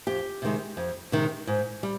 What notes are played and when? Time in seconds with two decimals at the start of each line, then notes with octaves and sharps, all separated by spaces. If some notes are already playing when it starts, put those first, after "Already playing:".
0.07 F2 G4
0.42 C3 D#3 G#3
0.77 F2
1.12 C3 D#3 G#3
1.47 G#2
1.83 G3